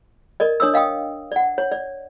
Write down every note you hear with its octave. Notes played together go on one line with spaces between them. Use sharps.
A#4 D5 D#5
D4 C#5 D#6 E6
D#5 F5 G5 D#6
D5 F#5
C#5
D5